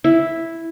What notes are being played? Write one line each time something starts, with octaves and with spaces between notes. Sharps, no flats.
E4